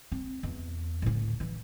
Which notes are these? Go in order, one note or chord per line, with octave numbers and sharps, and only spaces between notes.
C4
E2
D2 A2
E3